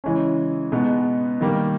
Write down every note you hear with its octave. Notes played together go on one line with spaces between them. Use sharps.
C#3 E3 G#3 C#4
B2 G#3 B3 D#4
D#3 G3 A#3